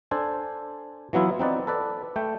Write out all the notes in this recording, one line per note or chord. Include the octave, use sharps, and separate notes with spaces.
D4 A4 C5 G#5
E3 F#3 B3 E4 F4
C4 D#4 B4 D5
A4 B4 D5
A3 G5